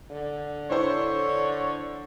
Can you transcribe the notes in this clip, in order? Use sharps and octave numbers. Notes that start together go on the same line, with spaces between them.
D3
D4 E4 C5 C#5